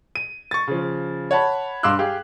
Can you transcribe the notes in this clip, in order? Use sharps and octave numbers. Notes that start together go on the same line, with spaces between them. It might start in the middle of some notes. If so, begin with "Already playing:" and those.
D#7
C#6 A6
C#3 F3
C#5 F#5 A5 B5
G2 F5 C6 D6 E6 F#6
G4 G#4 F5